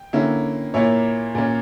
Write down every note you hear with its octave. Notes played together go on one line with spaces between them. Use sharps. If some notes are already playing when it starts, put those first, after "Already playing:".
Already playing: G5
D3 A#3 C#4 E4
A#2 A#3 E4 C#5 E5
A#2 A#3 C#4